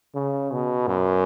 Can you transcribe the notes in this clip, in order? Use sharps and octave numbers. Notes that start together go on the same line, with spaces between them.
C#3
B2
F#2